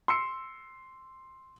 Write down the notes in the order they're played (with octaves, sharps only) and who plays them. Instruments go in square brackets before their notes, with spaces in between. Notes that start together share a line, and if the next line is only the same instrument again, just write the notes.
[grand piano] C6 E6 C#7